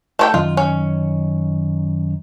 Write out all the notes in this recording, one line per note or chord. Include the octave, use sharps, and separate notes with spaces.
A3 C#5 G5
F#2 D#3 F4 D#5
C#4